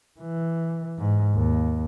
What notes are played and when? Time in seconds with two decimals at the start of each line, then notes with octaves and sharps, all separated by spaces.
0.20 E3
0.99 G#2
1.35 D#2